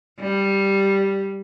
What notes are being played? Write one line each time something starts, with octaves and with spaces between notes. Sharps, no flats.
G3